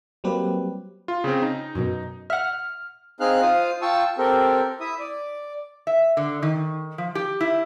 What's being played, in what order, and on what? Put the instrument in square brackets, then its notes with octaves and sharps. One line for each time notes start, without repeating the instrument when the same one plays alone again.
[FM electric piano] F#3 G3 A#3 C4 G4 B4
[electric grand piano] F4
C#3 C4
D#4
[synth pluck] F#2 B2
[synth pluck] E5 F#5 [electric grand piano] F6
[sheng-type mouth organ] C4 D#4 G#4 F5 F6 F#6
F4 C5 F5 D#6
F4 G5 A5 C#6 E6
C4 G4 A4 A#4
E4 E5 D#6
D5
[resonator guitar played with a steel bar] E5
D3
D#3
F3
G4
E4